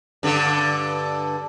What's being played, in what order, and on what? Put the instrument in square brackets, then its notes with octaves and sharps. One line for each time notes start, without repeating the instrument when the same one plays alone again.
[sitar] G2 D3